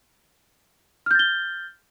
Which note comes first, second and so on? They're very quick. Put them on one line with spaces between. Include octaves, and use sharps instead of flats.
F6 G6 A6 G7